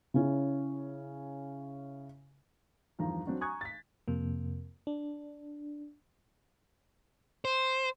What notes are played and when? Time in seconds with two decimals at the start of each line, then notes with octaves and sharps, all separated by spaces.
0.14 C#3 C#4 E4
2.99 E2 G2 D#3 F3 A#5
3.26 F#3 C4 D4 F#4
3.41 G#5 A#5 C#6 D#6 F#6 G#6
3.61 A6 B6
4.08 F2 C3 A#3
4.87 D4
7.45 C5